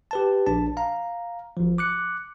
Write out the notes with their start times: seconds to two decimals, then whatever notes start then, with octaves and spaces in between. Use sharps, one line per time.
0.11 G4 B4 A5
0.47 A#1 D4 A5
0.77 F5 A#5
1.57 G#1 F3
1.78 D6 F#6 C#7